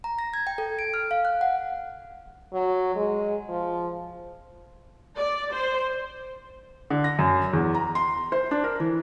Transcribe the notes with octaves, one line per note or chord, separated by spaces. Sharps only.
A#5
A#6
G#6
G5
A4
D7
F6
F5
F#6
F#5
F#3
G#3
F3
D5
C5
D3
A#6
F#2
E2
A#5
C6
C5
D4
A#4
E3